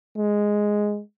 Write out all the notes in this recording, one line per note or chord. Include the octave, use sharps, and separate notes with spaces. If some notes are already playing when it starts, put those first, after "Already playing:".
G#3